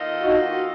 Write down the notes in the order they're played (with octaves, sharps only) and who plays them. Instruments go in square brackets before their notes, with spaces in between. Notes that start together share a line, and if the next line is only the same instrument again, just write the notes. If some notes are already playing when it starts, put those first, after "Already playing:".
Already playing: [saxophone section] D#3 A#3 F4 A4 D#5
[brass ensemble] D#4 F#4